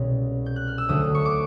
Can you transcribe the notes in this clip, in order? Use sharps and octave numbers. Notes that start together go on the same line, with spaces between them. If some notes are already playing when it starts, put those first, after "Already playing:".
Already playing: C2 B2 G#3 C#4
G6
F#6
F6
E6
D2 D3 F#3 A3 D#6
C#6
D6